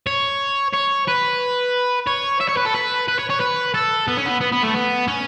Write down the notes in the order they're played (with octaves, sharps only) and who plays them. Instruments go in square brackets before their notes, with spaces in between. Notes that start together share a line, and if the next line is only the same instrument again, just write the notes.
[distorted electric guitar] C#5
C#5
B4
C#5
E5
C#5
B4
A4
B4
B4
C#5
C#5
B4
A4
B3
C#4
B3
B3
B3
A3
B3
C#4